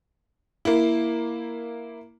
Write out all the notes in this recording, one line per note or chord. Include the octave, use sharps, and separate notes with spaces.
A#3 E4